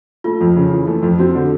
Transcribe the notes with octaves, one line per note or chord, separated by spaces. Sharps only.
A3 F4
F2
C#3
E3
A3
F2
C4 F#4
D3